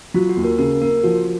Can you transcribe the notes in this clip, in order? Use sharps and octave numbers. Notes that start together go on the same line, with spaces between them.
F#3 F4
F#4
D#2
A#4
C#3 A#4
A#3 A#4
F3 F#4